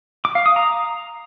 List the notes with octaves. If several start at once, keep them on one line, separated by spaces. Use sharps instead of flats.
D6
F5
D#6
A#5